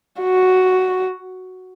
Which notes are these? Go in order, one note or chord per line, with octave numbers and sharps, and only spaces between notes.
F#4